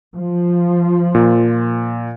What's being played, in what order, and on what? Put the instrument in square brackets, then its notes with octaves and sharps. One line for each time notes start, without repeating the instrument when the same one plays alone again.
[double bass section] F3
[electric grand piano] A#2